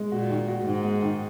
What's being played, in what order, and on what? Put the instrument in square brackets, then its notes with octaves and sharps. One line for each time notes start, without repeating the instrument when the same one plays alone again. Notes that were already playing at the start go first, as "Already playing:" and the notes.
Already playing: [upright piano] G#3
[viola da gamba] A#2 [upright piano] F#4
[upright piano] D#3
F#4
[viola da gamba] G#2 [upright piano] D#3
[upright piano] G#3
D#3